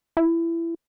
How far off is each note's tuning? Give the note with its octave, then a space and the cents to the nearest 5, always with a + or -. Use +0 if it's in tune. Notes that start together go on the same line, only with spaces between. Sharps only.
E4 +20